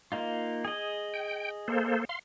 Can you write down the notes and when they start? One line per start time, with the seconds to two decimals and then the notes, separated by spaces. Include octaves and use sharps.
0.12 A#3 D#4 F4
0.65 G#4 D#5
1.14 G5
1.68 A#3 A4 C5
2.09 F5 C6